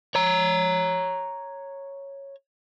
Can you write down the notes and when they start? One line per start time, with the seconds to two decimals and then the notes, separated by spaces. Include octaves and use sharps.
0.15 C#5 A#5